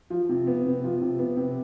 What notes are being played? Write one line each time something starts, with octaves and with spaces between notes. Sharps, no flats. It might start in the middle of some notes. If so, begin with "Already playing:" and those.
F3
C3
B3
C3
F3
C3
B3
C3